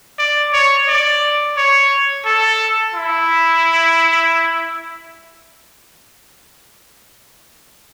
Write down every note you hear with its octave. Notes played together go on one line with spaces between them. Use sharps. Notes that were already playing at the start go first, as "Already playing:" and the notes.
D5
C#5
D5
C#5
A4
E4